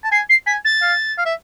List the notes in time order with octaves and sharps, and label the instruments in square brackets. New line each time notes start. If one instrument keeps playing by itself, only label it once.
[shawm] A5
[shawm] G#5 [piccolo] C7
[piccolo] C7
[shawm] G#5 [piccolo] B6
[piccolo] A6
[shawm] F5
F5
E5